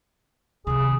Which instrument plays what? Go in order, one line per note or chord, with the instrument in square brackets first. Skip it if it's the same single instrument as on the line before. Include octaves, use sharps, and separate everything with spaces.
[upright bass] C3 D#3 [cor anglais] G#4